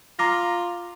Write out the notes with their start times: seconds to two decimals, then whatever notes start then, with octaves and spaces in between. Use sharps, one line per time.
0.19 F4 A#5 D6 A#6